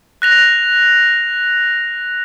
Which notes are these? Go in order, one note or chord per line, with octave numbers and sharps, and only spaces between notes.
F#6 A#6 F7